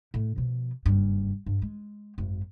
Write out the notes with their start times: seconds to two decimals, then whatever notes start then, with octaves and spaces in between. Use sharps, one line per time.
0.14 A2
0.36 B2 F3
0.86 F#1 G2
1.46 G2
1.62 G#3
2.18 G#1 F#2